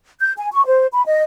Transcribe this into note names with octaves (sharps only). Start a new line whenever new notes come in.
G6
G#5
C#6
C5
B5
D#5